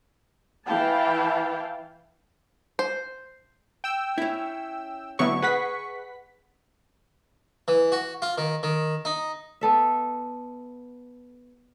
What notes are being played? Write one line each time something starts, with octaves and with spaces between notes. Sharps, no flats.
E3 E4 F5 G5 A5
C5
G5 E6
C#4 E4
A2 D3 F#3 B3 E4 C#6
G#4 B4 D#5 F#5 B6
E3
F#4
F4
D#3
D#3
D#4
B3 A4 E5